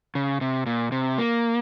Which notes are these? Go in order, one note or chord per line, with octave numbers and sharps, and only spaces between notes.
C#3
C3
A#2
C3
A#3